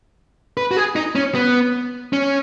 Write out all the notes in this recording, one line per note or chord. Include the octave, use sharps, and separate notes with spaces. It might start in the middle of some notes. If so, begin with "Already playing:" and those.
B4
F#4
G#4
D#4
C#4
B3
C#4